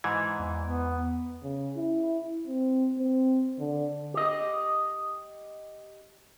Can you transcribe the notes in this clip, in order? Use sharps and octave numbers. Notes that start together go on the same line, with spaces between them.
G#2 E3 G#6
E2
B3
C#3
E4
C4
C4
D3
G4 D#5